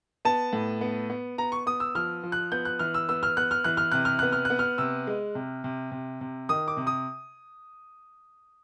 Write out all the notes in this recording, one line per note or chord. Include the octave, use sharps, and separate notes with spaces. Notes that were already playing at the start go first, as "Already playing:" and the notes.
B3 A5
A2
B3
B3
B3 A#5
C#6
B3 D#6
E6
F3 F6
F3
F#6
B3 G6
F#6
E3 F6
E6
B3 E6
F6
B3 F#6
F6
E3 F#6
F6
C3 F#6
F6
B3 F#6
F6
B3 F#6
F6
C3 E6
G#3
C3
C3
C3
C3
D#3 D#6
D6
C3
D#6